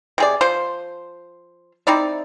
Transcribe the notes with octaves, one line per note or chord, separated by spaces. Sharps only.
C3 G#4 D5
F3 C5
C4 D#4 E4 D5